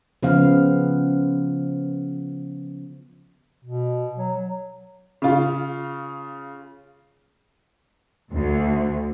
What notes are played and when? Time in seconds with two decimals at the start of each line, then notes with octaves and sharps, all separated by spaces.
0.23 C#3 F3 B3 F5
3.64 B2
4.17 F#3
5.22 C#3 F4
8.32 D2